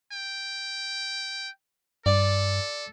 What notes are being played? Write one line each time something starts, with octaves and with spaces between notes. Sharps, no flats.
G5
G2 A4 D5